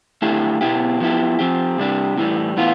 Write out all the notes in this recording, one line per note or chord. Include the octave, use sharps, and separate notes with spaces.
D3 A3 E4 G4
B2 B3 E4 G4
F3 B3 E4 G4
F3 C4 G4
C3 G3 D4 G4
A2 E3 G3
A2 E3 B3 F4